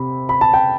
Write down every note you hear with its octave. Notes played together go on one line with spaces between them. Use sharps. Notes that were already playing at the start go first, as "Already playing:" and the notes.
Already playing: C3 C4 B5
B5
A5
G5